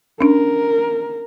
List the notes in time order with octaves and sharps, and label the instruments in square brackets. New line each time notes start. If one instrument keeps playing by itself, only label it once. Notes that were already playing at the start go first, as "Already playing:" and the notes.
[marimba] C#4 D4 [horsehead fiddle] A#4